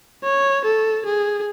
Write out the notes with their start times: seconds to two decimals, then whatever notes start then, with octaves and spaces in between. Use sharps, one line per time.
0.24 C#5
0.65 A4
1.06 G#4